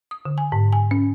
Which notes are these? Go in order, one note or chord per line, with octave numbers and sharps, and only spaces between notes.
D#6
D3
G#5
G#2
G#5
C#4